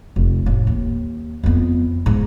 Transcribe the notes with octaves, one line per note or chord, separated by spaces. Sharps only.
F1
A1
D#2
F2 B3
G#2